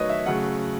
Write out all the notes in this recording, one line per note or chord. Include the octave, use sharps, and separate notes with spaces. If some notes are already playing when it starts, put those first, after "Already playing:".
Already playing: D#3 F#3 A3 B4 C#5 D#5
E5
C#3 F#3 A3 F#5